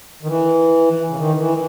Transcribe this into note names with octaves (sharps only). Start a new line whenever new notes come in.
D#3
E3
C#3
D#3
E3